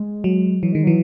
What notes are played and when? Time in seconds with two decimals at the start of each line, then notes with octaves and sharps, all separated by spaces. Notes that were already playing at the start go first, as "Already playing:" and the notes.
Already playing: G#3
0.24 F#3
0.63 E3 F#3
0.73 D#3 G#3
0.84 E3 F#3